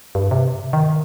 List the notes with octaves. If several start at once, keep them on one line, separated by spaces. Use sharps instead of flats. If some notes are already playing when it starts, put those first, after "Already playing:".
G2
C3
D#3